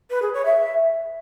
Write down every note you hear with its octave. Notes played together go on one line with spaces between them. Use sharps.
B4
G#4
C#5
E5